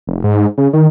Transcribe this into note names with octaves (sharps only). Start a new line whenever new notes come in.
F1
G#2
C#3
D#3